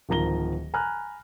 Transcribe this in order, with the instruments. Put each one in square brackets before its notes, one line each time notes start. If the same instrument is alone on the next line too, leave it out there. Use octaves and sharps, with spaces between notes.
[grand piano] D1 D#3 F3 A#5 A#6 G7
G#5 A#5 B5 F6 F#6